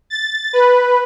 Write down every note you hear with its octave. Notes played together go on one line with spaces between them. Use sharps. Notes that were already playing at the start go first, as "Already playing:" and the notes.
A6
B4